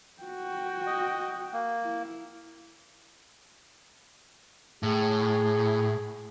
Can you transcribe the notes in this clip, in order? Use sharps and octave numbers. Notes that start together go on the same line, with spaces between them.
F#4 G5
D#5
A#3
E4
A2 G#4